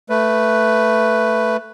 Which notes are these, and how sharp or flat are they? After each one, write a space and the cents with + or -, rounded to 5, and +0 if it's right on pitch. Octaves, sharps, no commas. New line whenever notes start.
A3 +10 B4 +0